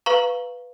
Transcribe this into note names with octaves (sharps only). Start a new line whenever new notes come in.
B4 F5 A#5 C#6